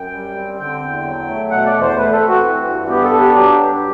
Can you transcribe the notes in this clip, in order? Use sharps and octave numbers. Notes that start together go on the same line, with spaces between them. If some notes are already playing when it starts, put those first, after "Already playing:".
Already playing: F#2 G5
G3
C4
D3 G5
E2
F#3
A3
B2 F#5
D5
E2
C5
A3 B4
A4
C4
F#4
E3
G2
B3 G4
A4
D4
G4
F#3 G4
G2